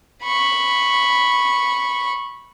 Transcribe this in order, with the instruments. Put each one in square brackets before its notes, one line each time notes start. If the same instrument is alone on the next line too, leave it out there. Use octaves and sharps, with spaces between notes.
[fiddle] B5 C#6